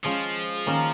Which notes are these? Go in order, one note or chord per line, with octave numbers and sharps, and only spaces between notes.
F3 G#3 C#4 F4 G#4
D#3 A#3 C#4 A#4